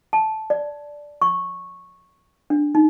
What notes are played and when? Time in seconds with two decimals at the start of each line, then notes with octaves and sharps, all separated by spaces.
0.13 A5
0.50 D5
1.22 C#6
2.50 D4
2.75 D#4